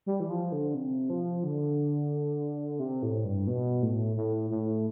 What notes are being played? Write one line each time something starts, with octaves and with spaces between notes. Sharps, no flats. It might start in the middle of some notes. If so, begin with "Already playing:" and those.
G3
E3
F3
D3
C3
F3
D3
C3
A2
G2
B2
A2
A2
A2